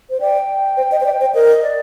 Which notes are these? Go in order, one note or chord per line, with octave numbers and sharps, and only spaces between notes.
C5
D5 G5
C5
D#5
C5
D5
C5
A#4 D#5
D5